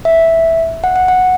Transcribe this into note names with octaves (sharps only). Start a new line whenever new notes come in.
E5
F#5
F#5
F#5